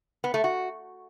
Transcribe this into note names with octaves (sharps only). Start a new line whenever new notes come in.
B3
A3
F#4